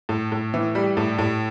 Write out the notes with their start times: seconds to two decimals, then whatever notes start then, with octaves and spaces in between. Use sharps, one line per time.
0.09 A2
0.32 A2
0.54 E3
0.75 G3
0.97 A2
1.18 A2